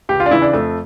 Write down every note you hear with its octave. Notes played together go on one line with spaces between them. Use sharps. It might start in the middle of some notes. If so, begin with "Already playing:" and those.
C#2 G4
F4
D4
C#3 E3 E4
D4
F2 A3